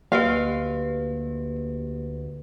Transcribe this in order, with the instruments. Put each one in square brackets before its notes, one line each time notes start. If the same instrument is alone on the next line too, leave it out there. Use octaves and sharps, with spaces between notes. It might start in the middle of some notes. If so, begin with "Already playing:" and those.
[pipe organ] D2 [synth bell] A#3 G4 B4 [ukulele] F5